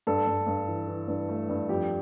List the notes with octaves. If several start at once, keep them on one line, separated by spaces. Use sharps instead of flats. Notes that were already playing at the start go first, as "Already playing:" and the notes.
G2 A4
G2
G2
E3
E3
G2
A3
G2
F2 G4